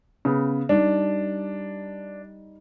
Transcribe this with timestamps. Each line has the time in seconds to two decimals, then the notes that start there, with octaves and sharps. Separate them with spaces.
0.25 C#3 B3
0.69 G3 D4 D#4